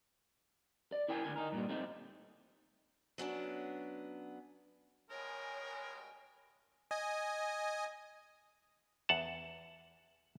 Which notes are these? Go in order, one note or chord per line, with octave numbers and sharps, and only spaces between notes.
D5
E4 A#4 G5 G#5
D2 A#2 D3 G#5
D#4 A#4
G2 A#2 G3
A3 C4 D#4
F#3 B3 C#4 D4
G2 B2 G#3 A#4 C#5 G5 G#5
D#5 G#5
E2 F#5 A5